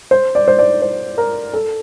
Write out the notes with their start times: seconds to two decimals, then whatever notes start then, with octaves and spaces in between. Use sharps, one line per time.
0.11 C5
0.35 D5
0.48 C5
0.59 D5
0.82 C5
1.18 A#4
1.54 A4